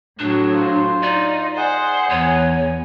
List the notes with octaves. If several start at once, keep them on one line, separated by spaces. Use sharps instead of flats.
A2 F#3 D4
F4 C5
D#4 D5
G#4 C5 F#5
E2 C#5 G#5